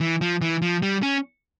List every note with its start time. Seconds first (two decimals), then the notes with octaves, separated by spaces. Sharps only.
0.01 E3
0.21 F3
0.42 E3
0.62 F3
0.82 G3
1.02 C#4